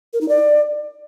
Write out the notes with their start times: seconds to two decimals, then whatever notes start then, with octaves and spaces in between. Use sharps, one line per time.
0.13 A#4
0.21 D#4
0.29 D5